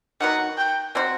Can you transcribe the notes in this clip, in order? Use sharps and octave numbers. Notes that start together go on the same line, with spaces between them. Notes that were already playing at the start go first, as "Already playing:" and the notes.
D#3 F#3 B3 F#4 F#5
G5
B2 F#3 C4 F#4